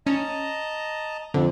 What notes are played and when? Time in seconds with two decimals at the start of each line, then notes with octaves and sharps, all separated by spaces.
0.07 C#4 D#5 A5 A#5
1.34 F2 D3